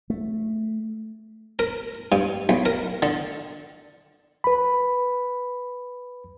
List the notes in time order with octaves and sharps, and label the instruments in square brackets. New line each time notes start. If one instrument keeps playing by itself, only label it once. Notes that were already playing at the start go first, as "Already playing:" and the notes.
[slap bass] A3
[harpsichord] A#4
G2
B1
A#4
D3
[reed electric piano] B4 B5